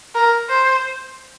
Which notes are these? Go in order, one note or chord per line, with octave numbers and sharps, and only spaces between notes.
A#4
C5